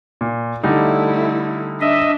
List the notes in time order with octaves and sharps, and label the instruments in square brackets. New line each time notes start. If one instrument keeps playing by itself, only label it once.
[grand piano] A#2
[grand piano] D3 G3 D#4 [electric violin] A3 E4
[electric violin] D4 [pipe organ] D#5 E5